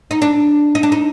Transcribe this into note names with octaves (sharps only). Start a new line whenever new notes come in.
D#4
D4
D#4
D4
D#4